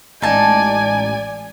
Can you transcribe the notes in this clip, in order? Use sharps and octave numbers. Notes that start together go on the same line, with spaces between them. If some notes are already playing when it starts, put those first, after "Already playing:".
A1 G#3 D#4 D5 G#5 A5